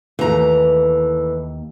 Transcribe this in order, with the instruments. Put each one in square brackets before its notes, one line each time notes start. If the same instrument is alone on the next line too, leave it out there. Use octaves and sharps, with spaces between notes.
[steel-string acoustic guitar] D#2 A#5 [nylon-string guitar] E3 A3